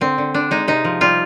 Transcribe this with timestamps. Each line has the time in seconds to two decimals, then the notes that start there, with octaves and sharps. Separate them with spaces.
0.01 D3 C4
0.18 D3
0.34 D3 D4
0.51 G#3 D#4
0.68 C3 D#4
0.85 F3
1.01 G3 F4